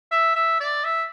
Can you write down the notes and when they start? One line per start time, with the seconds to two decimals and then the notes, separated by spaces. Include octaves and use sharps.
0.11 E5
0.35 E5
0.60 D5
0.84 E5